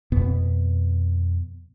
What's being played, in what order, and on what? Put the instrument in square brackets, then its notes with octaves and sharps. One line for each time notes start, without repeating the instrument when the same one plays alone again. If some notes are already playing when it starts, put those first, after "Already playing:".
[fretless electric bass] F2 B2 B3